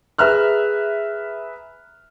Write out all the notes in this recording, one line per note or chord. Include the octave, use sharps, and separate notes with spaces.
G#4 B4 E5 A#5 F6 F#6